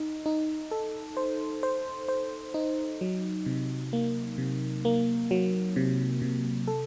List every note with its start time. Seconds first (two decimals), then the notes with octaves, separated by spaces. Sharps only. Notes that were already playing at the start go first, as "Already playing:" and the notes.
Already playing: D#4
0.26 D#4
0.71 A4
1.17 C5
1.63 C5
2.08 C5
2.54 D#4
3.01 F#3
3.46 C3
3.93 A#3
4.38 C3
4.85 A#3
5.31 F#3
5.76 C3
6.22 C3
6.67 A4